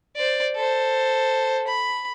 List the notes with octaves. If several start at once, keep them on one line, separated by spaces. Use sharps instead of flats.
C5 D5
A4 C5
B5